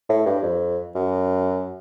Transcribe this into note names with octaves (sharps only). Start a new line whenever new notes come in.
A2
G2
F2
F#2